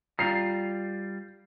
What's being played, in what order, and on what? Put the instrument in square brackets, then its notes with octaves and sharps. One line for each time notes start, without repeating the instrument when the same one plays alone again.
[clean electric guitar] G3 F4 A#5 [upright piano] C7